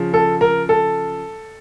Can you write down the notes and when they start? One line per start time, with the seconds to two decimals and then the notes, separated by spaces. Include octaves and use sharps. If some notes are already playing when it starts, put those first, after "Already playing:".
Already playing: C#3 F3
0.14 A4
0.41 A#4
0.69 A4